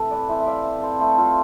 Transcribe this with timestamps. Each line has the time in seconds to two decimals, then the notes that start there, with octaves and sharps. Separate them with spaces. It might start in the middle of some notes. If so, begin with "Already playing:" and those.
Already playing: A2 C3 E3 A4
0.10 B4 D5
0.29 E3 C5 E5
0.40 E5
0.46 D5 F5
0.65 C4
0.82 A4 C5
1.00 A3 A4 C5
1.18 F4 A4